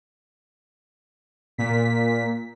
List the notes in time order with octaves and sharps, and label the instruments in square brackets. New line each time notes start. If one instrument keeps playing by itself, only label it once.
[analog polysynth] A#2 B6